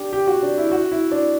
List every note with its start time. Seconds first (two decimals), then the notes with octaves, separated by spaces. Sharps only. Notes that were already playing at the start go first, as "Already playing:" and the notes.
Already playing: D4 G4
0.13 G4
0.27 F#4
0.43 D4
0.58 E4
0.72 F#4
0.92 E4
1.11 D4